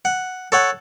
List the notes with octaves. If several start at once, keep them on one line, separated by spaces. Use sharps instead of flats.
F#5
A4 C#5 F#5